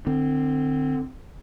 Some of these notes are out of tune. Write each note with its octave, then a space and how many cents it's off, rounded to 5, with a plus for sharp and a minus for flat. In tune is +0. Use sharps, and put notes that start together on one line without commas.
D3 +35 C4 +0